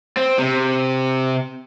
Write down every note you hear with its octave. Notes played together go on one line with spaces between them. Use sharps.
C4
C3